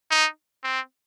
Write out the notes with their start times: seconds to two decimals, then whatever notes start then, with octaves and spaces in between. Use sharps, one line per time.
0.11 D#4
0.64 C4